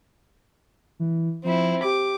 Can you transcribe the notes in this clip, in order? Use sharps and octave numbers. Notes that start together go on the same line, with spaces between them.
E3
F3 C4 E4
G4 D6